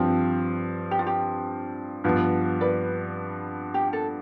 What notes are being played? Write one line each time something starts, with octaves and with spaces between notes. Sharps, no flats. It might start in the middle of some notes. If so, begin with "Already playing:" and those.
Already playing: G2 F3 C4 G4
G4
F4
G4
G2 F3 B3
B4 D5
G4
A4